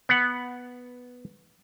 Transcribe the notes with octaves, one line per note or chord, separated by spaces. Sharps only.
B3 F#5